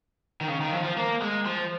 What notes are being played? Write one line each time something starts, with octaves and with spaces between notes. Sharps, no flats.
D#3
C#3
D#3
F3
F3
A#3
G#3
F3